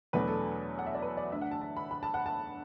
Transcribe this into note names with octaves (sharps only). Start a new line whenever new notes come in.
E2 B2 F#3 A3 D4 B4
A4
F#5
E5
D5
B4
D5
D2 D3 A3 D4 E5
F#5
A5
A5
B5
B5
A5
F#5
A5